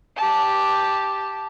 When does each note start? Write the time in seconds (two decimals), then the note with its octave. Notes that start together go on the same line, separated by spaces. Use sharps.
0.17 G4 A5